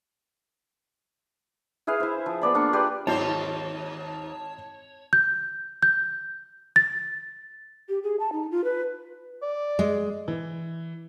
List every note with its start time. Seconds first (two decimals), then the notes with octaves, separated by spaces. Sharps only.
1.87 E4 G#4 B4 F5
2.00 E4 C5
2.26 F3
2.41 B3 D5 B5
2.54 A#3 D4 F4 C#6
2.73 G4 B4 D5 C6
3.07 G#1 D#2 F#3 C4 E4 C5 C#5 A5
5.13 G6
5.83 G6
6.76 A6
7.89 G4
8.03 G#4
8.20 A5
8.33 D#4
8.51 F4
8.64 B4
9.43 D5
9.79 G#3
10.28 E3